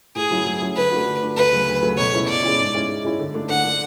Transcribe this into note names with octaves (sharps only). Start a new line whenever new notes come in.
A2 G#4
F#3 C#4 E4
A2
F#3 C#4 E4
D3 B4
A3 D4 F#4
D3
A3 D4 F#4
D2 B4
C#3 F#3 A3
D2
C#3 F#3 A3
B2 C#5
G#3 C#4 E4
B2 D5
G#3 C#4 E4
G#2
G#3 C#4 E4
G#2
G#3 C#4 E4
D3
A3 D4
D3 F#5
A3 D4